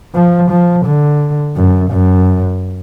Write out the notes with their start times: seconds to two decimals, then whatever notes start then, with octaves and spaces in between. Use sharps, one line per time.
0.15 F3
0.51 F3
0.86 D3
1.56 F#2
1.91 F#2